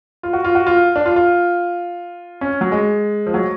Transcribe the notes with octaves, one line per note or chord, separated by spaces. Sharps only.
F4
F#4
F4
F#4
F4
D4
F4
F4
C#4
F#3
G#3
F3
F#3